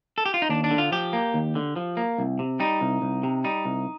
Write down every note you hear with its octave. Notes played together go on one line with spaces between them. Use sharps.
A4
G4
F4
D#4
D#2 D4
D4
D3
F4
F3 G4
A#3
D#2
D3
F3
A#3
C2
C3
G3 D#4
C2
C2
C3
G3 D#4
C2